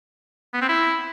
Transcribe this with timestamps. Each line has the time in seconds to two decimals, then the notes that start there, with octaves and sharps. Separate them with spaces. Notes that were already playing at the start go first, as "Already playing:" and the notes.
0.54 B3
0.61 C4
0.69 E4